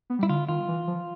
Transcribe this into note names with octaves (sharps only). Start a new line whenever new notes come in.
B3
G3
E4
D3 F4
D#3 F4
E3
F3